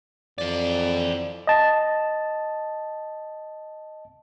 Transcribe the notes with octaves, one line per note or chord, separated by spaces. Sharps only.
F2 E3 D5
D#5 A5